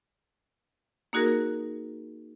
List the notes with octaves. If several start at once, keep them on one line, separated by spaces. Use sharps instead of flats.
A#3 D#4 F#4 G#4 A#4